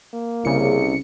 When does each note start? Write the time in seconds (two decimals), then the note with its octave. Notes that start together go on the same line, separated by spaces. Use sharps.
0.14 A#3
0.45 C2 C#3 C#7